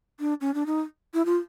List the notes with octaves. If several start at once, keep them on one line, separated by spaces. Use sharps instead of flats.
D4
C#4
D4
D#4
E4
F4